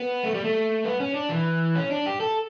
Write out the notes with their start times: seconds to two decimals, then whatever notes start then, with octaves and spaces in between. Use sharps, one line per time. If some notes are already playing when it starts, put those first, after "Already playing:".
Already playing: B3
0.24 A3
0.34 G3
0.44 A3
0.84 B3
1.00 C#4
1.14 D4
1.30 E3
1.75 C#4
1.90 D4
2.06 G4
2.20 A4